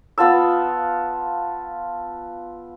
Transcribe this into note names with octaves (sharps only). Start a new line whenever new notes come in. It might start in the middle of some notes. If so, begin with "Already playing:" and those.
B3 F4 A5 E6